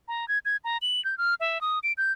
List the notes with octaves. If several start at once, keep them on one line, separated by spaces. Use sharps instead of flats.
A#5
G#6
G#6
A#5
F#7
G6
F6
E5
D#6
D7
G6